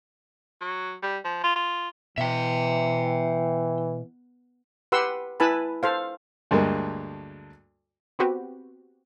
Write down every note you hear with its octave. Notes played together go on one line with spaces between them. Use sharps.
F#3
G3
F3
F4
F4
B2 E3 E5 G5
G4 B4 F#5 C6 E6
E4 B4 G#5 A5 B5
A4 C5 F5
D2 G2 G#3 A#3
B3 C4 F#4 G4 B4